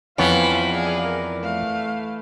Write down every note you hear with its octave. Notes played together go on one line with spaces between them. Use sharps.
F2 E3 B3 C5 C#5 F5 B5
G#4 D5 F5
A#4
A3 F5